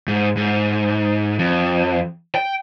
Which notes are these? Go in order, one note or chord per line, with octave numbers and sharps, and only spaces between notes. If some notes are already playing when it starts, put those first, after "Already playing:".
G#2
G#2
F2
G5